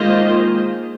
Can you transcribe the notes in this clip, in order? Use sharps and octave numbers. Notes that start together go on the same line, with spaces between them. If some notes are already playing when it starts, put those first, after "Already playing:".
Already playing: D#3 G#3 A#3 F4 C5 D#5